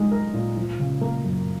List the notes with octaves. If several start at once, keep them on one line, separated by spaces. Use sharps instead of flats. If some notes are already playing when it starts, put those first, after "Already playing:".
Already playing: F3 G#3 D#4
A#4
A#2
F3
C#3
A#3
F#2